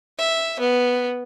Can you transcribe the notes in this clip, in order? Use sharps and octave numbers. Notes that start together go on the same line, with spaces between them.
E5
B3